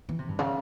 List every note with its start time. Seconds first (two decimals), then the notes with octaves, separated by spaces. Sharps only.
0.09 E3
0.19 C3
0.29 G2
0.39 C#3